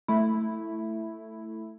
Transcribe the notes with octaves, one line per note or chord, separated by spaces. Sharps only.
A3 E4